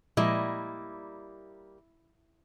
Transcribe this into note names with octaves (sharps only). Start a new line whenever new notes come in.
A#2 F3 G3 G#3 A#3 E4 D#5